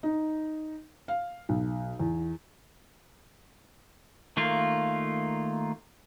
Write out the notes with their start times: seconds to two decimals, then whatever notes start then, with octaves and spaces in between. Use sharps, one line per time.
0.03 D#4
1.08 F5
1.49 B1
1.99 E2
4.37 D#3 A3 A#3 F4